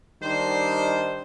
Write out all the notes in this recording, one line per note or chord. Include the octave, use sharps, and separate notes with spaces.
D#3 G3 D4 D#4 C5